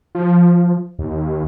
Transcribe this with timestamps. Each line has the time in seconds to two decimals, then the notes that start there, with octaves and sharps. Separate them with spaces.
0.15 F3
0.99 D#2